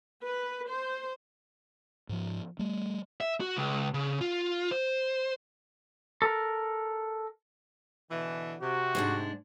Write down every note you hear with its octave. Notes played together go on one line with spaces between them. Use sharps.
B4
C5
G#2 F3
G3 A3
E5
F#4
C#2
C#3
F4
C5
A4 A#4
B2 D3 E3
C3 F#4
G#2 G#3 D4